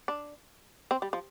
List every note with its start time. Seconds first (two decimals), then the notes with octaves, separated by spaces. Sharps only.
0.08 D4
0.91 C4
1.02 G3
1.13 F3